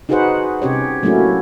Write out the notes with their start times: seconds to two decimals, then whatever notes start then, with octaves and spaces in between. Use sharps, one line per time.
0.09 D#4 F#4 G#4 B4 C5 F#5
0.62 C3 C#4 G4 C#5
1.03 F#3 A3 A#3 C#4 E4 F#4